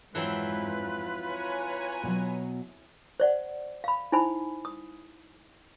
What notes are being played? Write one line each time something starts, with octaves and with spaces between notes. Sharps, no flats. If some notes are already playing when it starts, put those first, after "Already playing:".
F2 G#2 E3 F#3 C4 F4 B4
C#5 G#5 A#5
B2 F#3
C5 D5 F#5
F5 B5
D#4 E4 C5 G#5 B5
D#6